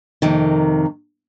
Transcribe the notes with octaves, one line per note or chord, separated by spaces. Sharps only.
F2 C3 D#3 A#3